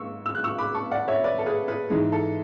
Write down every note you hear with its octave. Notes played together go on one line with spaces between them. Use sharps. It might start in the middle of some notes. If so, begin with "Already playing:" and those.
Already playing: G#2 C#6 E6
E6
F#6
C#6 E6
B5 D6
A5 C#6
D5 F#5
C#5 E5
B4 D5
A4
G#4 B4
G#4 B4
G#2 E3 G#3 G#4
A4